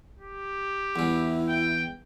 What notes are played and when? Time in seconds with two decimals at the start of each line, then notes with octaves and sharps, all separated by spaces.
0.19 G4
0.96 E2 E3 E4
1.48 G5